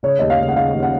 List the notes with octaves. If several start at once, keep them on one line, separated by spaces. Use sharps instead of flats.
C#3 C#5
D#2 D#5
F5
C#3
F#5
C#3 F5
D#2
F#5